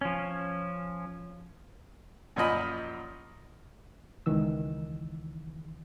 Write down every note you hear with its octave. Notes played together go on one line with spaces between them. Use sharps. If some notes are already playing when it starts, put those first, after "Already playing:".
F3 C#4
F#2 A#2 F3 D#5 B5
C#2 D#3 E3 E6